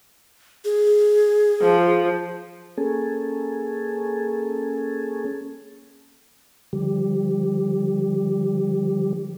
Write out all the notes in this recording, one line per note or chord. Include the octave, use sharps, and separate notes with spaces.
G#4
F3
A#3 C#4 G#4 A4
D3 F3 G3 G4